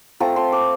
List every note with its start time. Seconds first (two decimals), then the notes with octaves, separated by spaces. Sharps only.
0.20 A3 C4 F4 A#5
0.36 C6
0.53 D6